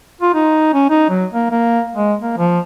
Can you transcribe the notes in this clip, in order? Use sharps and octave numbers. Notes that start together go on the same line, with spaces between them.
F4
D#4
C#4
D#4
F#3
A#3
A#3
G#3
A#3
F3